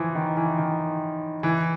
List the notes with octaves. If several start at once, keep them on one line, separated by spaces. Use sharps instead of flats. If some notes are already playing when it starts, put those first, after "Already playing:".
Already playing: E3 F3
D#3
E3
D#3
E3